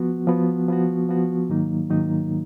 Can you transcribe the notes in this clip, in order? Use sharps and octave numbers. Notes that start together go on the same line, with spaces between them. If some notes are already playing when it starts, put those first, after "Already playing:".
Already playing: F3 B3 F#4
F3 B3 F#4
F3 B3 F#4
F3 B3 F#4
G#2 D#3 F#3 A#3 D#4
G#2 D#3 F#3 A#3 D#4